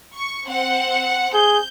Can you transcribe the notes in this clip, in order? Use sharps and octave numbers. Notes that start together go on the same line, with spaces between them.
C#6
C4 F#5
G#4 G6